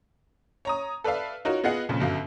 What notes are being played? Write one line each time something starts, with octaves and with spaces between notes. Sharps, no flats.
C#5 A#5 D#6
A4 B4 D5 E5 F5
D#4 F4 F#4 A#4 C#5
B3 F4 G#4 D#5 F#5
F2 A#2 C#3
G1 F#2 F5